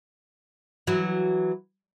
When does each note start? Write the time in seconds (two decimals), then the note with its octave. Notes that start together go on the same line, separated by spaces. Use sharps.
0.87 E3 F#3